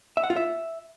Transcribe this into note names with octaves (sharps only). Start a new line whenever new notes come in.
E5
F#5
F4
E5